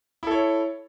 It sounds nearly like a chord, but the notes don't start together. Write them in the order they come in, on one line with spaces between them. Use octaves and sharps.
E4 A4 C#5